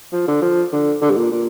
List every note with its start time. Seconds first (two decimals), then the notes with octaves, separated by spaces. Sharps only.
0.12 F3
0.28 D3
0.42 F3
0.72 D3
1.01 D3
1.10 G2
1.17 A#2
1.32 A#2